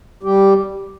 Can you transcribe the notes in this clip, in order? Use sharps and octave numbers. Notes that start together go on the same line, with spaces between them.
G3 G4